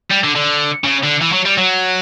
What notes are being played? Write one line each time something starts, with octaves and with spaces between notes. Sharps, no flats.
G3
D3
D3
C#3
D3
E3
F#3
G3
F#3